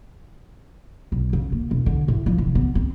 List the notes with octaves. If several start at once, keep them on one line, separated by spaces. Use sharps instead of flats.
B1
C#3
A#3
E1
D3
A2
F3
F1
B3
C4